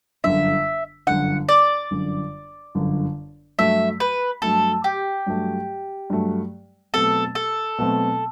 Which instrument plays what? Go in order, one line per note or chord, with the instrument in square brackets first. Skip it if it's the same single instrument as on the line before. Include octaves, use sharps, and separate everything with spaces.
[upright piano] G1 F#2 D3 [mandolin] E5
[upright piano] G1 F#2 D3 [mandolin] F#5
[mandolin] D5
[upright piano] G1 F#2 D3
G1 F#2 D3
[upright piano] G2 F#3 A3 [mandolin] E5
[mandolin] B4
[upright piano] G2 F#3 A3 [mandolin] A4
[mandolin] G4
[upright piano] G2 F#3 A3
G2 F#3 A3
[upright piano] B2 F#3 A3 C4 [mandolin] A4
[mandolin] A4
[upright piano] B2 F#3 A3 C4